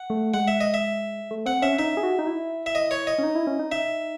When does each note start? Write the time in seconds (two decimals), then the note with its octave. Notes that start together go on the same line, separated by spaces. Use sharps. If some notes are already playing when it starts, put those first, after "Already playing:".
Already playing: F#5
0.10 A3
0.34 G#3 F#5
0.48 E5
0.61 D#5
0.74 E5
1.31 A3
1.46 C4 F#5
1.62 C#4 E5
1.79 D#4 E5
1.97 G#4
2.03 F#4
2.19 D#4
2.27 E4
2.66 E5
2.75 D#5
2.91 C#5
3.07 D#5
3.18 C#4
3.23 D#4
3.35 E4
3.47 C#4
3.59 D#4
3.72 D#4 E5